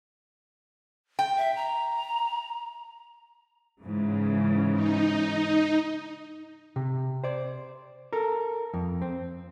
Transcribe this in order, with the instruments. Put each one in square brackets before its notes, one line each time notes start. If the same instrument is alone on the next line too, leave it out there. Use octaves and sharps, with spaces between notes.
[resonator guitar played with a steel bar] G5
[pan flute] E5
A#5
[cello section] G#2 C#3 E3
[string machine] D#4
[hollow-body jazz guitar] C3
C5 D5
A4 A#4
F2
C4